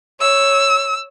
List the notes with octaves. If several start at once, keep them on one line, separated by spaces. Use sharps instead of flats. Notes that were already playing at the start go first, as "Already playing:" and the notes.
C#5 E6